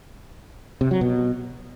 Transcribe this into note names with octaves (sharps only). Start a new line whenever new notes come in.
C3
F#3
B2